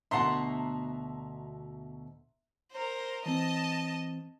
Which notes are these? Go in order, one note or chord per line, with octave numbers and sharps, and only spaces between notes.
D2 B2 E5 F#5 A5 A#5 C6 C7
A#4 C5
E3 C4 D#5 A5